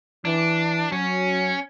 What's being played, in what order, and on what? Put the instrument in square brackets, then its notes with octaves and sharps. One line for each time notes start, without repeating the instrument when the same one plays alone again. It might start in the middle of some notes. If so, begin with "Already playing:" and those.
[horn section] E3 [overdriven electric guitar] D4
[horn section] F#3 [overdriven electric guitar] C#4